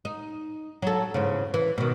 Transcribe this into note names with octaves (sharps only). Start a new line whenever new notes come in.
D#4
F#3 A4
E2 G#2 C#3
E3
B2 D#3